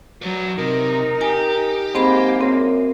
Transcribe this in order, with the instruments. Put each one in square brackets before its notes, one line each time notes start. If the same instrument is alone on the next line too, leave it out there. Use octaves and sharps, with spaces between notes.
[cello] F#3 [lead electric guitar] B4 D5
[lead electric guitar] C3 [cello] D#4 [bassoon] A#4
[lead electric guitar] G4 [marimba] G#5
[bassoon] G#2 [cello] A#3 [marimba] C4 C5 B5
[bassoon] F#2 [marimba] C4